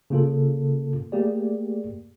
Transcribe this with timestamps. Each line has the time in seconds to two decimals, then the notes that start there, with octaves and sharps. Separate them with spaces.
0.10 C#3 A#3 F4 A4
1.12 A3 A#3 G4 G#4 D5